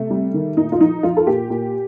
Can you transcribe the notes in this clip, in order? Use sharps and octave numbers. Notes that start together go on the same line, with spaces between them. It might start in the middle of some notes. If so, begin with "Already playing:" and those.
Already playing: C3 A3
G3
D#3
A#2 D#4
F4
F3 D#4
F3 F4
A4
A#2 G4
A#2